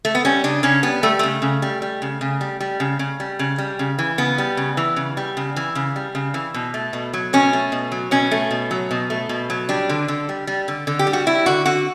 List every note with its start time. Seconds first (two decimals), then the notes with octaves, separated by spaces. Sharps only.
0.05 A3
0.15 B3
0.25 G3 C#4
0.44 C#3 D4
0.63 C#3 C#4
0.83 G3 B3
1.03 G3 A3
1.19 C#3 A3
1.42 C#3
1.62 G3
1.82 G3
2.02 C#3
2.21 C#3
2.41 G3
2.61 G3
2.80 C#3
2.99 C#3
3.20 G3
3.39 C#3
3.58 G3
3.79 C#3
3.99 E3
4.18 C#3 B3
4.38 G3
4.57 C#3
4.77 E3
4.96 C#3
5.17 G3
5.37 C#3
5.56 E3
5.75 C#3
5.96 G3
6.15 C#3
6.34 E3
6.54 B2
6.74 A3
6.93 B2
7.13 F#3
7.33 B2 C#4
7.53 A3
7.72 B2
7.92 F#3
8.11 B2 C#4
8.31 A3
8.51 B2
8.71 F#3
8.91 B2
9.10 A3
9.29 B2
9.50 F#3
9.69 G3 D4
9.89 D3
10.08 D3
10.29 G3
10.47 G3
10.68 D3
10.87 D3
10.99 G4
11.07 G3
11.13 F#4
11.27 G3 E4
11.46 D3 F#4
11.66 D3 F#4